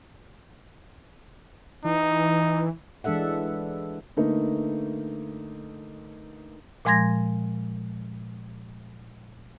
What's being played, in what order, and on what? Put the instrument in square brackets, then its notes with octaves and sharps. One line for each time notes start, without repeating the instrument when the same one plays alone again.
[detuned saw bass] E3 [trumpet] D#4
[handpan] E3 G#3 D4 A4 E5 F#5
[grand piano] D3 A3 A#3 D#4 A#4 B4
[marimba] A#2 F3 G#3 C6 G#6 A#6